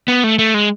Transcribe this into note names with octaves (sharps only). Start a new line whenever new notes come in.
B3
A3
A3
G#3